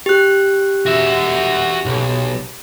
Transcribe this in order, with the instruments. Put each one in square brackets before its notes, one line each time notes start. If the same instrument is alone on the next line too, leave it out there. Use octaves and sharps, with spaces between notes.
[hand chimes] G4 F#6
[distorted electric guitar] F#4 E5
B1